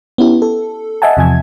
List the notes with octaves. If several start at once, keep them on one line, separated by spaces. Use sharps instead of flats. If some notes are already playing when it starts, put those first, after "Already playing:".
B3 C#4 E4 G4
A4
D#5 E5 F#5 G#5 A5
E2 C3 F3 G#5 G#6